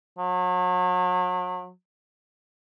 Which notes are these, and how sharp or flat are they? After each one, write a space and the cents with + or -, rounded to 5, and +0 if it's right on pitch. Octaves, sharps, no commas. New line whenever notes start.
F#3 -35